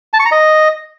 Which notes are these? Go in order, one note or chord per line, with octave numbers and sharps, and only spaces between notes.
A5
C#6
A#5
D#5